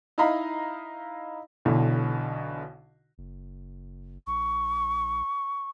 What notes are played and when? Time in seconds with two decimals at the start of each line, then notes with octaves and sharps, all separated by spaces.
0.18 D#4 E4 D#5 F5 A#5 B5
1.65 B1 B2 D3 E3
3.18 F#1
4.27 A#1 C#6